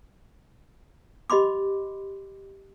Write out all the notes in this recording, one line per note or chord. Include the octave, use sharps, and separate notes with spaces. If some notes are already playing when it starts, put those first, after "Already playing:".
G4 D#5 B5 C6 D6